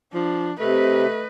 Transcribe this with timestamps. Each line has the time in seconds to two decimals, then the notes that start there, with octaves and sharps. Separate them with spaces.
0.14 F3 D4
0.60 C3 A3 B4 D#5